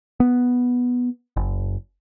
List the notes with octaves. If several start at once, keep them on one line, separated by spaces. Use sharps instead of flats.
B3
F#1